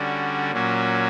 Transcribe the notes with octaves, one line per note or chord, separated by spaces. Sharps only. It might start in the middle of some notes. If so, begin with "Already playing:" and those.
Already playing: D3 G3 C#4 F#4
A#2 F#3 C#4 F#4